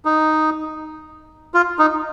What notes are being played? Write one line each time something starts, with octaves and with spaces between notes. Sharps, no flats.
D#4
F4
D#4